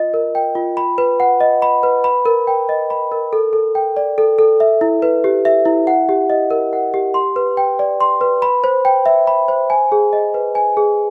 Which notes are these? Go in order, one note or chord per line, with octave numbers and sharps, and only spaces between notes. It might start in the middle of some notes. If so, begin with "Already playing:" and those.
Already playing: F4 D#5
A#4
G5
F4
B5
B4
F#5
D#5
B5
B4
B5
A#4
G5
D#5
B5
A#4
A4
A4
G5
D5
A4
A4
E5
E4
B4
G4
E5
E4
F#5
G4
D#5
A#4
F#5
G4
C6
B4
G5
D5
C6
B4
B5
C5
G5
E5
B5
C5
G#5
G#4
D#5
B4
G#5
G#4